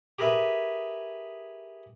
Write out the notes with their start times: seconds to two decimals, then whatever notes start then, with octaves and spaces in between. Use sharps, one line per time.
0.19 G4 G#4 A#4 B4 E5